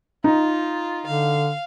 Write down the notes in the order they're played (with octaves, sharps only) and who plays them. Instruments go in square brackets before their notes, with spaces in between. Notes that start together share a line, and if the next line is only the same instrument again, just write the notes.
[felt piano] D#4 [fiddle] F4
[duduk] D3 [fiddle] F5